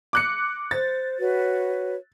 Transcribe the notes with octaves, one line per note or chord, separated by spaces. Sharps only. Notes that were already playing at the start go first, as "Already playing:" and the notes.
D6 F#6 C#7
C5 A6
F#4 B4 C#5